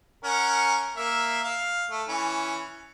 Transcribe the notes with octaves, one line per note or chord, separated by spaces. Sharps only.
C#4 A#4 F#5
A#3 E5
F5
A3
E3 C#4